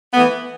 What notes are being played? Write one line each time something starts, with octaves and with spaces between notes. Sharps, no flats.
E3 A3 B3